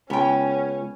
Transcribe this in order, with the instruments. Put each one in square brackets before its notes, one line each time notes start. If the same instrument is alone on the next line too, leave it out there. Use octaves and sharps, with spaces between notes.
[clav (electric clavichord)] C#2 [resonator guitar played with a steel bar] B3 G5 [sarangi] C#4